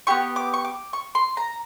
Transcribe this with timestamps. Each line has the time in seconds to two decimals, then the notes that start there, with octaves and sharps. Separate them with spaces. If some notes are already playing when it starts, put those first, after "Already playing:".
0.07 B3 E4 G4 C#6
0.36 D6
0.54 C#6
0.65 D6
0.93 C#6
1.15 C6
1.37 A#5